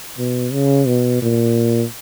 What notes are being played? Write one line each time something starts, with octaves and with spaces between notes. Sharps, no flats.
B2
C#3
B2
A#2